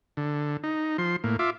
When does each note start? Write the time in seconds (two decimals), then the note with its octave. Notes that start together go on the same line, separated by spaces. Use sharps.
0.17 D3
0.63 D#4
0.98 F3 C6
1.24 A2 A#3
1.39 F4 E5 D6